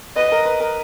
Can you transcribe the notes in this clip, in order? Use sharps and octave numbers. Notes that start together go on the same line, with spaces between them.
B4 D#5
A#4
B4
A#4